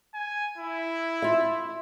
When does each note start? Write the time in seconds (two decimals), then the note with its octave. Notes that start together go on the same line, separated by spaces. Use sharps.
0.14 G#5
0.58 E4
1.22 F4 E5